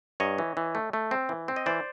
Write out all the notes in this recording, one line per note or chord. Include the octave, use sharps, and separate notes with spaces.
G2 C#5 D#5
E3
E3
A3
A3
C4
E3
C4
D#5
E3 C5 D5